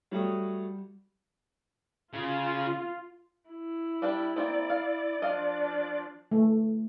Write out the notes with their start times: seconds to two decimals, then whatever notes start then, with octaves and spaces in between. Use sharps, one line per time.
0.12 F#3 G3 A3 D#6
2.14 C#3 F4
3.50 E4
4.02 G3 D4 G4
4.36 A#3 C4 D#4 D5
4.70 F5
5.22 F3 D4 D#5 F5
6.31 A3